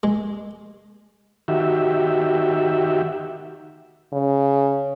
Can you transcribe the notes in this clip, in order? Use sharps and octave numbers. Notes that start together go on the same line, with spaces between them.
G#3
D#3 F#4 G4 E5
C#3